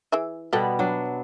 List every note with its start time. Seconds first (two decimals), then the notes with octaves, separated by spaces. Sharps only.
0.12 E3 G#4 E5
0.53 B2 G3 B3 A4 F#5
0.79 F#3 D4